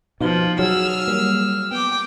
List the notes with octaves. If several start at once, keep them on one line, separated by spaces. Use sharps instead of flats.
B2 F3 D#4 F5
F#3 G#4 E6 F6
G3 A#3
B3 G5 D6